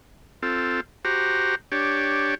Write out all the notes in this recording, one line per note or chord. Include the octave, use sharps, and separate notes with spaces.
C4 F4 A4
F#4 G4 C5 A#5
D4 G4 C#5